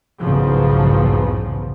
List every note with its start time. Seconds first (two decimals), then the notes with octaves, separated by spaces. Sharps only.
0.20 B1 E2 G#2 C#3 F3